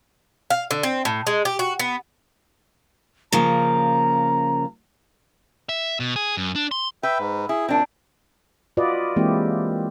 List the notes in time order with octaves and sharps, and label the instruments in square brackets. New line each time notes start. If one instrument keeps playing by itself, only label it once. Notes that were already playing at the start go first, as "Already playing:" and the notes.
[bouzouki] F5
D3
C4
A2
G#3
G4
F#4
B3
[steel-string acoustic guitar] C#3 F3 A#3 [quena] A#5
[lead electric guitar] E5
B2
G#4
F#2
D4
C6
[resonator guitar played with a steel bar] B4 [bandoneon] E5 G5
[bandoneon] G#2
[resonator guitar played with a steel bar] E4 [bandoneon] G#4
[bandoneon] F#2 A#2 [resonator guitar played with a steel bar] C4 D4
[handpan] F4 F#4 B4 D5 D#5
E3 G#3 A#3 C4 E4 G4